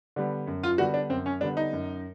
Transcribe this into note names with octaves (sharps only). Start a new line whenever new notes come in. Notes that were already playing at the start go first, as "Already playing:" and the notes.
D3 G3 B3
F#2
F4
D3 G3 B3 F#4
D4
F#2 C4
C#4
D3 G3 B3 D4
D#4
F#2